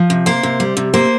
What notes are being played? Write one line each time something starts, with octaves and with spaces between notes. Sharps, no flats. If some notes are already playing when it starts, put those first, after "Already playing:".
Already playing: F3
C3
A#3 C5
C3
G3
C3
A#3 C5